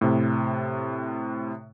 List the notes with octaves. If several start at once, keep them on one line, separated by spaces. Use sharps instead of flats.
A2 C3